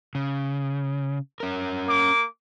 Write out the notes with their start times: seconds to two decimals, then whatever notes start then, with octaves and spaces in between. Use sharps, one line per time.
0.15 C#3
1.40 C#4 A#4
1.86 A#3 D6